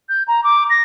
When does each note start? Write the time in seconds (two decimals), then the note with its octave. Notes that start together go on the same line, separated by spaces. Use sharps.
0.09 G6
0.28 A#5
0.44 D6
0.70 A#6